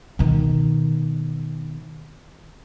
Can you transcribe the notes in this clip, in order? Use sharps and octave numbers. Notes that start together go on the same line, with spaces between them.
B2 D#3